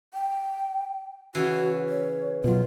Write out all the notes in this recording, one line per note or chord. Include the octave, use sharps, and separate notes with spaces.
G5
C#3 E3 F#4
C#5
B2 F#3 F4